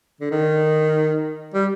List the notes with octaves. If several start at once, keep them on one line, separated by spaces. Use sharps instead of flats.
D3
D#3
G3